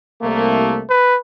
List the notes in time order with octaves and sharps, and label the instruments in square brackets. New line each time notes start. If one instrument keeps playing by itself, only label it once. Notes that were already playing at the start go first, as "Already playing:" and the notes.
[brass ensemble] C2 A3 A#3
[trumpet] B4